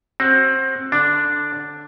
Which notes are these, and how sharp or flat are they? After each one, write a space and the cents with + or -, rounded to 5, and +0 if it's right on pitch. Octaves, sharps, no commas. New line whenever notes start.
C4 +20 F#4 +15
D3 +5 D4 +0